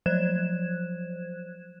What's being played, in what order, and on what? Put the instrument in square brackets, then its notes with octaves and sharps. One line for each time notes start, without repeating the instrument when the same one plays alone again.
[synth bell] F3 F#3 C5 F#6 G#6 E7